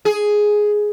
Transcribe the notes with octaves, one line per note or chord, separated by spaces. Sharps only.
G#4